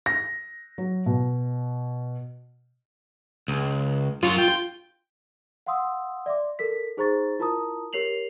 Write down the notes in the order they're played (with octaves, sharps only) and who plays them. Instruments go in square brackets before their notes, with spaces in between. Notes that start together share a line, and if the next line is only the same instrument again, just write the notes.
[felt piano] A#6
F#3
B2
[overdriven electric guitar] C#2
[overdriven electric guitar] F#2 C#5 [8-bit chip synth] F4
[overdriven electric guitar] G5
[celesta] F5 F#5 C6 D#6 E6
D5 E5 C6 D6
A4 A#4 B6
D#4 G#4 C5 A#5 C#6 A6
E4 F4 A#4 A5 A#5 D#6
G4 A#4 C#5 C7 F7 F#7